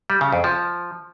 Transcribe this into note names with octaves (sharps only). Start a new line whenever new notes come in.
G3
C#3
F2
F3